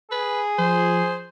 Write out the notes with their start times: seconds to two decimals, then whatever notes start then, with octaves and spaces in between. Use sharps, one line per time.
0.11 G#4 B4
0.58 F3 C5